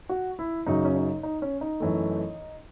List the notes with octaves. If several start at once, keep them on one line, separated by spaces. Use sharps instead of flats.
F#4
E4
F#2 C#3 F#3 D#4
C#4
D#4
D#4
C#4
D#4
F#2 E3 A3